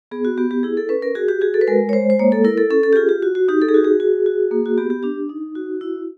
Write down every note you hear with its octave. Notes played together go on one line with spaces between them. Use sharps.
B3 G#4
F#4
B3 G4
G4
E4 G#4
A4
C#4 B4
A#4
F#4 G#4
G4
F#4 G#4
A4
B4
G#3 A#4
C#5
G#3 C5
C5
A#3 C#5
A4
E4 A#4
A4
C#4 A4
A4
G4
F4 G#4
G4
F#4
F#4
D#4 G4
A4
G#4
F#4 G4
G#4
F#4
F#4
A#3
F#4
B3 G4
G4
D4 G4
D#4
F#4
E4